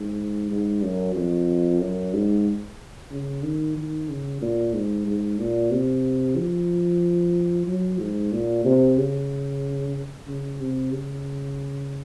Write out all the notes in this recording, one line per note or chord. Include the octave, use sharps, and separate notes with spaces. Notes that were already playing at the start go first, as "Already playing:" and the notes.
Already playing: G#2
G#2
F#2
F2
F#2
G#2
C#3
D#3
D#3
C#3
A#2
G#2
G#2
A#2
C3
F3
F#3
G#2
A#2
C3
C#3
C#3
C3
C#3